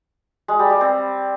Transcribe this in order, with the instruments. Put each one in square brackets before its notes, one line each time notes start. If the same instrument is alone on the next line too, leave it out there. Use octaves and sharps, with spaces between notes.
[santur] G#3
G3
G3
C4